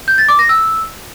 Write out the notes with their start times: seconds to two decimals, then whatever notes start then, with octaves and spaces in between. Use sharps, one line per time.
0.08 G6
0.18 A6
0.29 D6
0.39 A#6
0.49 E6